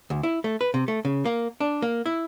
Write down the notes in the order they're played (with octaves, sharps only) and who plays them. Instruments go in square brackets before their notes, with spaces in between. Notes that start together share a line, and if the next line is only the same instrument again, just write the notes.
[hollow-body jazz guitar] D2
E4
A3
B4
C3
A3
C#3
A#3
D4
A#3
E4